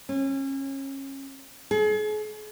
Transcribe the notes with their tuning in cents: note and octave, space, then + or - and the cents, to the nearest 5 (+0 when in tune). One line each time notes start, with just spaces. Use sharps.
C#4 -30
G#4 +40